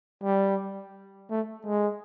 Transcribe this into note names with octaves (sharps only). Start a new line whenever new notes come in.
G3
A3
G#3